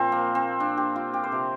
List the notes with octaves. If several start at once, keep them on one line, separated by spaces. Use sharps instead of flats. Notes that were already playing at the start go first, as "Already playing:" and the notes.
Already playing: A#2 F3 C4
A#3
C4
D4
G4
F4
G4
C5
C3 F3 A#4